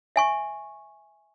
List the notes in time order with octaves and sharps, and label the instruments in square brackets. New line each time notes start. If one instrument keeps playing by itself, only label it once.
[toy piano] E5 G#5 C#6